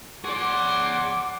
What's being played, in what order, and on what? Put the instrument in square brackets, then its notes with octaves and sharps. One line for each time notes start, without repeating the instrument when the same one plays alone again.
[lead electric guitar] G#4 D5 [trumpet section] C#5 A5 C6 [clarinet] F#5 [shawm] D6